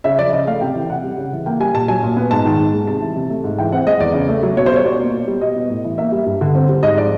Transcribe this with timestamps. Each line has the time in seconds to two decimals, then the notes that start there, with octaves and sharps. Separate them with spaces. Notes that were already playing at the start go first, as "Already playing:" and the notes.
0.04 C#3 E5
0.19 F3 D5
0.33 C#3 D#5
0.47 A3 F5
0.61 C3 G5
0.75 E3
0.90 C3 F#5
1.04 G3
1.18 C#3
1.32 E3
1.46 A#3 G5
1.60 G3 G#5
1.74 A#2 A5
1.88 F#3 G#5
2.03 A#2
2.17 B3
2.31 G#2 A5
2.45 D#3
2.59 G#2
2.73 G#3
2.87 C3 A5
3.02 E3
3.16 C3
3.30 A3
3.44 G#2
3.58 E3 G5
3.72 C4 F#5
3.86 G#3 D#5
4.00 E2 D5
4.14 C#3
4.29 A3
4.43 F#3
4.57 B2 C#5
4.66 C5
4.72 G3 C#5
4.85 B2 D5
5.00 A#3
5.14 B2
5.27 G3
5.41 B2 D#5
5.56 B3
5.70 A2
5.84 E3
5.98 A#3 E5
6.12 G3
6.26 G2
6.41 D3
6.55 C4
6.69 G3
6.83 G#2 D#5
6.97 F3 D5